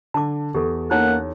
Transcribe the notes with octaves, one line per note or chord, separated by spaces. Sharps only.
D3 A5 D6
E2 G4 A4
A#3 C#4 D#4 E4 C#5 F#5